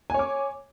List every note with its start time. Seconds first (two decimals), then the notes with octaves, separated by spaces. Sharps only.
0.10 G#5
0.14 C#5
0.19 D6